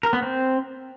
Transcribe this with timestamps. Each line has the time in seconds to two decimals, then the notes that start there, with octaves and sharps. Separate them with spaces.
0.03 A#4
0.13 B3
0.23 C4